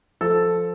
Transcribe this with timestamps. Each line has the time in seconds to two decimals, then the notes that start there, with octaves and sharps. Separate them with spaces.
0.21 F3 A4